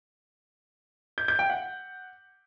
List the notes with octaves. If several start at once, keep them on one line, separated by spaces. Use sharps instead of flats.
G6
G6
G5
F#5